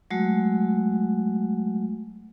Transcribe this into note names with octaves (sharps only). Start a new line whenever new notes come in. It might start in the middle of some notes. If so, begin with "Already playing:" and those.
F#3 G#3 A3 F#4